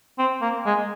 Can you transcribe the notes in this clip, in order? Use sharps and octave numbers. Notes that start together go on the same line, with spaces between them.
C4
A#3
G#3